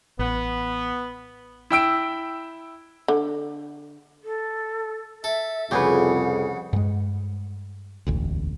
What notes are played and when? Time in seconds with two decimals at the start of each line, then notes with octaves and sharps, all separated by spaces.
0.19 A1 B3
1.70 E4 G5 E6 D7
3.08 D3
4.23 A4
5.24 A4 E5
5.71 C2 F2 C#3 G4 G#4 B4 F#5
6.73 G2 G#3
8.07 E1 A1 D2